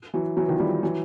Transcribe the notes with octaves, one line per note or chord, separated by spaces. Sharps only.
E3 F#3
E3 F#3
D#3 F3
F3 G3
E3 F#3